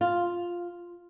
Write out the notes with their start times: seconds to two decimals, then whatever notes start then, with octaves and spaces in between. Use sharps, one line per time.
0.01 F4